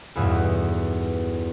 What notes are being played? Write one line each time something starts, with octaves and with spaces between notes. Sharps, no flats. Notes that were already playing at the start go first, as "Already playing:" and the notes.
B1 E2 G2 E4 F#4 D#6